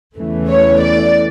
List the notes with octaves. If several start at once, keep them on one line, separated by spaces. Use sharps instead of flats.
E2 C#3 E3 A3
C#5
D5